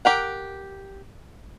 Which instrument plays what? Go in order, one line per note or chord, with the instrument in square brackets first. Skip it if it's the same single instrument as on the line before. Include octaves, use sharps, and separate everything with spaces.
[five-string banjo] G4 A#4 F#5